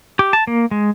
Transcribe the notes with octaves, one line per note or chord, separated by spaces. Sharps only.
G4
A5
A#3
G#3